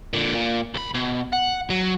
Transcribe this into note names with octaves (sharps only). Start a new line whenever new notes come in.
A#2 D3
A#2
C2 B5
B2
F#5
F#3